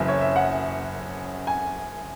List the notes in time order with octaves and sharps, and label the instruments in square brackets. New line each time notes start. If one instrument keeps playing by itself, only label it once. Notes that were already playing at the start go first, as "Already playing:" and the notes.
Already playing: [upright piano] F#1 F#2 C#3 E3 E5
C#5
E5
F#5
G#5